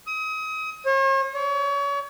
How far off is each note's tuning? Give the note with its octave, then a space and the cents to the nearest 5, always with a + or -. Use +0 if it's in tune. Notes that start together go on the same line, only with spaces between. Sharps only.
D#6 +35
C#5 -45
C#5 +30